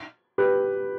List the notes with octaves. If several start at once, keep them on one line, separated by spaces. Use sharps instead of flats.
G4 B4